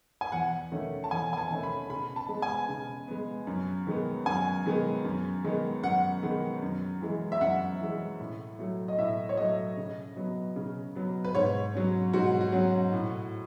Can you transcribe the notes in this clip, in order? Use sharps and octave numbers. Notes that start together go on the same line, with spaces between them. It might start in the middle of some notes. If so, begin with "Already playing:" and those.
G#5
E2 F#5
D#3 A3 C#4
A5
E2 G#5
G#5
A5
D#3 A3 C#4
B5
C#3 B5
A5
G#3 B3
G#5
C#3
G#3 B3
F#2
D#3 G#3 B3
F#2 G#5
D#3 G#3 B3
F#2
D#3 G#3 B3
F#2 F#5
D#3 G#3 B3
F#2
E3 G#3
E5
F#2 F#5
E3 G#3
A2
F#3 A3
D#5
A2 E5
C#5
F#3 A3 D#5
C#3
F#3 B3
C#3
F#3 B3
B4
G#2 C#5
F#3 C#4
G#2 F#4
F#4
F#3 C#4
A2